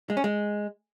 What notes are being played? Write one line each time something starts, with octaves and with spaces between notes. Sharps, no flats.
G#3
C#4
G#3